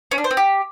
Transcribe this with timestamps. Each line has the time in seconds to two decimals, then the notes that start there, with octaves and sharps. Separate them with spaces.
0.11 C#4
0.18 D4
0.24 C5
0.31 C4
0.37 G4